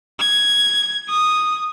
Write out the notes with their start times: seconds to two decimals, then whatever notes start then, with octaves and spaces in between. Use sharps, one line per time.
0.20 G#6
1.09 D#6